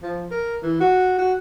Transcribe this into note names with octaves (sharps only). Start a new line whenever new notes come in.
F3
A#4
E3
F#4
F#4